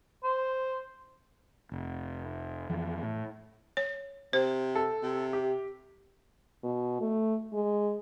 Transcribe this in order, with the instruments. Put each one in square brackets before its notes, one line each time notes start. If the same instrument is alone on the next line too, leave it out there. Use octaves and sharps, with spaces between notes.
[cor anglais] C5
[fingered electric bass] F1
F2 E3
A2
[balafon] C#5
[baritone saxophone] C3 [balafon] C5
[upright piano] A4
[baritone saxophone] C3
[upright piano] G4
[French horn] B2
A3
G#3